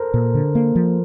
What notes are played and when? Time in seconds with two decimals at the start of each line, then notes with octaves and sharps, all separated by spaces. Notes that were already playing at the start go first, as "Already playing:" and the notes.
Already playing: A4 A#4 C5
0.14 A#2
0.34 D3
0.55 A#3
0.76 F3